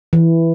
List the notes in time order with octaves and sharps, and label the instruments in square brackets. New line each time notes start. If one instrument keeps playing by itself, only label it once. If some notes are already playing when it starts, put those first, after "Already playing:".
[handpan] E3